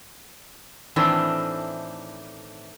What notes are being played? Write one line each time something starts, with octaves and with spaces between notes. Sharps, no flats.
A2 D#3 E3 A3 C4 D4